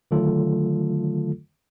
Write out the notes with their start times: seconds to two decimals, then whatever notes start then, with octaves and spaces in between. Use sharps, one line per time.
0.11 D3 D#3 F#3 A3 F4 A4